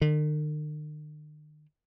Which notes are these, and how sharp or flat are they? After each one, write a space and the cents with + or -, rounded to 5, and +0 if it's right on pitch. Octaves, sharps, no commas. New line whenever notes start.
D#3 -45